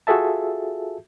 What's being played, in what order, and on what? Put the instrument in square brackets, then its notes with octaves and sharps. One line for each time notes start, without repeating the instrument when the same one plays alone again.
[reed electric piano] F4 F#4 G#4 A4 E5 A5